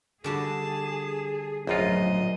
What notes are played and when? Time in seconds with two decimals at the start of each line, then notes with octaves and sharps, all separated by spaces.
0.24 D3 G3 F#4 G#4 A5
1.67 A#1 F#2 A2 F#3 F4 D#5